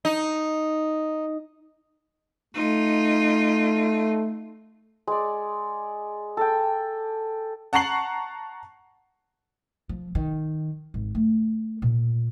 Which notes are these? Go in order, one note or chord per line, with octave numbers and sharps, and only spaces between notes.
D#4
A3 D#4 F4
G#3 D5
A4 G5
F#5 A5 A#5 C#6 C7 F#7
F3
D#3
G#1
A3
A#2